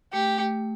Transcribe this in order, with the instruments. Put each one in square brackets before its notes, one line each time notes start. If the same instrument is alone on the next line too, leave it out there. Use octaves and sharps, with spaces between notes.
[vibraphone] A3 [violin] G4
[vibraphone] A3